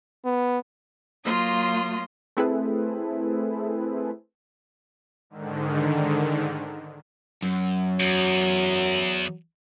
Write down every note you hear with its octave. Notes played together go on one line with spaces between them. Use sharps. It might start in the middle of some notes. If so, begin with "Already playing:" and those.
B3
F#3 A#3 F4 C6 D#6
A3 C4 E4 G#4 A4 B4
G#2 D3 D#3
F#2
E2 F#3